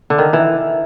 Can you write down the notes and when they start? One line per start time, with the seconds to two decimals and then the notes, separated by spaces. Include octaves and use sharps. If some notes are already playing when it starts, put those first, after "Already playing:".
0.10 D3
0.18 D#3
0.33 E3